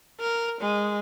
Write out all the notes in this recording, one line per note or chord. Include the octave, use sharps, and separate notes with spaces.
A#4
G#3